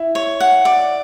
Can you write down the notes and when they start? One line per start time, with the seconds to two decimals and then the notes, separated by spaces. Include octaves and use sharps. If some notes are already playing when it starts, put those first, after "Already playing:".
Already playing: E4
0.15 C#5
0.40 F#5
0.65 D5